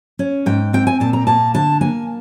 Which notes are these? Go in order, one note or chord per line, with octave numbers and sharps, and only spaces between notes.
C#4
G#2 G5
C4 G5
G#5
A#2 A5
A#5
A#3 A5
D3 A5
A#3 G#5